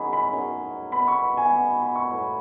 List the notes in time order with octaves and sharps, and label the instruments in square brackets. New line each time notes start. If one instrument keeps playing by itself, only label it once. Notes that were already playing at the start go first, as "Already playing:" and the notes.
Already playing: [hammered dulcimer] D#3 F#3 C#4 G#4 [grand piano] B5
[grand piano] B5
[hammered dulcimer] D#3 F#3 C#4 G#4
[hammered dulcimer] B3 D#4 F#4 B4 [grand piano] B5
[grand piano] C#6
G#5
[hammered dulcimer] B3 D#4 F#4 B4
[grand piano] B5
C#6
[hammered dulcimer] A2 E3 B3 E4